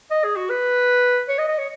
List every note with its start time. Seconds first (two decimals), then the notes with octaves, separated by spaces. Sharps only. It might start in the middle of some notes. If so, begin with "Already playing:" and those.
0.11 D#5
0.24 G#4
0.36 F#4
0.50 B4
1.29 C#5
1.38 D#5
1.48 D#5
1.58 C#5